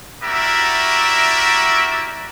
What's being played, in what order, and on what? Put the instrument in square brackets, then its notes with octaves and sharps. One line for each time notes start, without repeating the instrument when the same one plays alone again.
[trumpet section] E4 F#4 G4 A#4 D5 E5